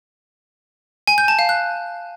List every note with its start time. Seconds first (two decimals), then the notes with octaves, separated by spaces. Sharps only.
1.07 G#5
1.18 G6
1.28 A5
1.39 F5
1.49 F#6